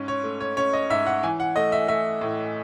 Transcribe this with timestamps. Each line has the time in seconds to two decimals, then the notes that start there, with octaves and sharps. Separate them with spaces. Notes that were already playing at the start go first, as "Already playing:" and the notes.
Already playing: G#2 C#4
0.08 C#5
0.24 A3
0.40 C#5
0.57 C#4 C#5
0.73 D#5
0.90 G#2 E5
1.06 F#5
1.23 E3 G#5
1.40 F#5
1.56 A3 D#5
1.72 E5
1.88 A3 E5
2.21 A2